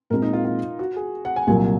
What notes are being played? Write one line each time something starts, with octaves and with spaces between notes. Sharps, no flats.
A#2 G#3 C4 A#4
D#4
F4
F4
F#4
G#4
F#5
G#5
C2 A#2 F#3 G#5